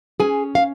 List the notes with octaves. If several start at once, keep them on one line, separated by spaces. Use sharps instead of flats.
C#4 G#4 G#5
F5